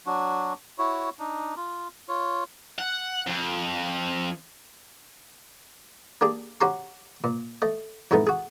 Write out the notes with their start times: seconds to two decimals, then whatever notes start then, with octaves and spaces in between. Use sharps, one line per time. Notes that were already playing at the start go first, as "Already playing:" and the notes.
0.07 F#3 D4 F#4
0.78 E4 F#4 C#5
1.19 D4 D#4
1.57 F4
2.08 F4 C#5
2.79 F#5
3.27 F2
6.21 A#3 D4 G4 G#4
6.61 C#4 F#4 G4 A#5 C6
7.24 A#2
7.62 A3 D#5
8.11 F2 A2 G#3 A3 B3 D#4
8.27 F#4 G#4